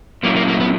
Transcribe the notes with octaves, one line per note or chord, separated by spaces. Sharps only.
A#2 F#3 A#3 C#4 E4
A#3
A#3
B3